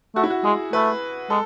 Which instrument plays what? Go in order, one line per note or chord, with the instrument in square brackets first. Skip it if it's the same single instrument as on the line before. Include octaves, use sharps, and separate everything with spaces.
[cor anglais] A3 [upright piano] F#4
[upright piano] E4
F#4
[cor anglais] G#3 [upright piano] G#4
[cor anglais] A3 [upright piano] B4
[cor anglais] G#3 [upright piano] A4